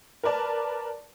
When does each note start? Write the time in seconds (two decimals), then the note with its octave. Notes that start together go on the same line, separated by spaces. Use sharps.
0.23 A#4 B4 D5 A5